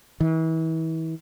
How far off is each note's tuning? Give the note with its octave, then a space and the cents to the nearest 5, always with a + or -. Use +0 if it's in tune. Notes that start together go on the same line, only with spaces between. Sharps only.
E3 -35